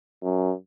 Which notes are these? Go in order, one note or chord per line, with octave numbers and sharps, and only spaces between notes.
F#2